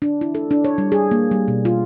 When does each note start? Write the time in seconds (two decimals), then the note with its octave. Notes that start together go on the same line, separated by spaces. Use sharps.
0.02 D4
0.21 E4
0.35 A4
0.51 D4
0.64 C#5
0.78 G3
0.92 G#4
1.11 A#3
1.31 G3
1.48 B2
1.65 F4